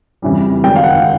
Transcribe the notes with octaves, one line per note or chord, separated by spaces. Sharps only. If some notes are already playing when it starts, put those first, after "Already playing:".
F2 C#3 E3 G3
G#1 F#2 D#3 G#3 G5
F5
F#5